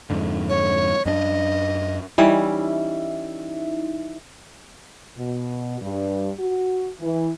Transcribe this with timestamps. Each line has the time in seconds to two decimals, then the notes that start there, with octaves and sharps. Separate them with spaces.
0.10 F2 G#2 D3
0.49 C#5
1.06 F#2 C#4 D4 D#5
2.18 E3 G3 C#4 D#4 E4 E5
5.17 B2
5.82 G2
6.39 F#4
7.01 E3